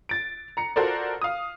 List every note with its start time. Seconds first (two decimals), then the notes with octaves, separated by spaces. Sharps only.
0.09 A6 D7
0.57 A#5 C#7
0.76 F4 F#4 A4 A#4 C5 D5
1.22 F5 D#6